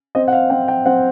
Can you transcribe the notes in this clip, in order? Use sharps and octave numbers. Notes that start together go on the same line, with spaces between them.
C4 D#5
F#5
F5
C4 G5
G5
C4 F#5